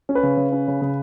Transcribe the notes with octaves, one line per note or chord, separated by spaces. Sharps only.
C#4
B4
C#3
C#3
C#4
C#3
C#3